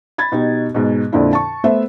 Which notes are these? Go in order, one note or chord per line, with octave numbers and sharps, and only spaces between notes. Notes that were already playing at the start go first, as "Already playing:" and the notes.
B5 G#6 A6
B2 D#4 G4
G#2 B2
F2 A#2 D3 D4 E4
A5 C#6
A3 B3 C5 E5